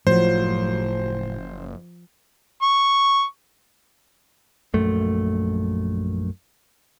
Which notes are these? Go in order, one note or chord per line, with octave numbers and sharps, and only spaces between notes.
F#1 A2 F3 F#3 C5
C#6
A#1 F#2 A3